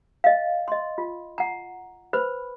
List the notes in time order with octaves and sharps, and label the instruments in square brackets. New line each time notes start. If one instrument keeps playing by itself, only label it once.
[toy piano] D#5 F5
D#5 C6
F4
F#5 A#5
B4 C5 B5